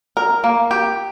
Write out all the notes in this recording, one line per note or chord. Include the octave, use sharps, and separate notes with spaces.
A#4
A#3
G4